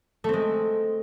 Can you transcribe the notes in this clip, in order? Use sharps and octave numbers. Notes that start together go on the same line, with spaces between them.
G#3 A3 C4